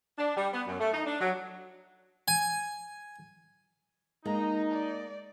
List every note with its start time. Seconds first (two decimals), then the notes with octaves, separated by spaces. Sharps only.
0.18 D4
0.36 G3
0.53 B3
0.67 F#2
0.80 A3
0.93 D#4
1.06 D4
1.20 F#3
2.28 G#5
4.25 G#3 A#3 D#4 G#4 A#5
4.71 D5